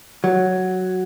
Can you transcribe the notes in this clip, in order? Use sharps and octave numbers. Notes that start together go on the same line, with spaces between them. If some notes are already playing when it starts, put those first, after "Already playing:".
F#3